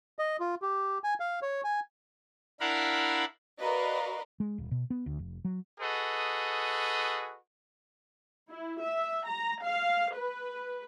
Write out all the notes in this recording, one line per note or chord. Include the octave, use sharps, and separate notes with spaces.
D#5
F4
G4
G#5
F5
C#5
G#5
D4 E4 A#4 F5 F#5 B5
F#4 A#4 B4 D5 D#5 F5
G#3
D#1
B2
B3
D2
F1
F#3
F#4 G#4 A4 B4 D#5
E4
E5
A#5
F5
B4